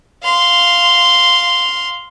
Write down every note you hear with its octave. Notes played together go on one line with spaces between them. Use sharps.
F5 C6